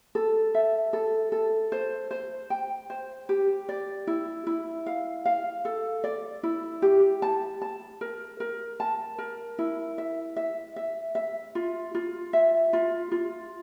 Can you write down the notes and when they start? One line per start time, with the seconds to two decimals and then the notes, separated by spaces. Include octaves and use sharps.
0.15 A4
0.55 E5
0.93 A4
1.32 A4
1.72 C5
2.11 C5
2.50 G5
2.90 C5
3.29 G4
3.69 D5
4.07 E4
4.47 E4
4.86 F5
5.25 F5
5.65 A4
6.04 D5
6.43 E4
6.82 G4
7.22 A5
7.62 A5
8.01 A#4
8.40 A#4
8.80 A5
9.18 A#4
9.59 E4
9.98 E5
10.36 E5
10.76 E5
11.15 E5
11.55 F4
11.95 F4
12.33 E5
12.73 F4
13.12 F4